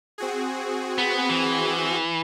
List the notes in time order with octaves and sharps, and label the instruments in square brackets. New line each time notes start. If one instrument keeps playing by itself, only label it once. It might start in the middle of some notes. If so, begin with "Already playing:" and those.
[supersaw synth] C4 F#4 G#4
[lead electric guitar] B3
E3